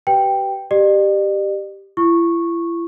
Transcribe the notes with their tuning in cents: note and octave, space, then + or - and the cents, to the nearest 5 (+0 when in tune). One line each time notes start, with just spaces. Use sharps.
G4 -30 B4 +0 G5 +0
G4 +0 D5 +45
E4 +40 C#6 -10